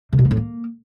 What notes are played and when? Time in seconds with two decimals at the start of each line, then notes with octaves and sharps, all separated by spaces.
0.13 C3
0.19 B2
0.25 A#3
0.31 A2
0.37 A#3